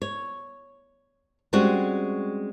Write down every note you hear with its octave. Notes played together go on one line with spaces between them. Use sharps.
C#5
G3 G#3 C4 C#4 F#4